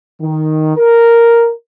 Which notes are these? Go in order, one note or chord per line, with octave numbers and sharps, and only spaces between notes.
D#3
A#4